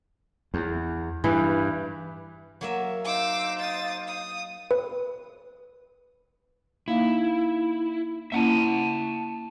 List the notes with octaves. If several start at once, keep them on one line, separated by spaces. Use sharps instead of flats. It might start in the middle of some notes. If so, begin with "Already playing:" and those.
E2
G2 E3
F#3 A#3 E5
D#4 C5 F5 D6 E6
D#6 A6
D#6
B4
A#3 D#4 E4 F5
A#3 C#4 E4 E5 F#5 A5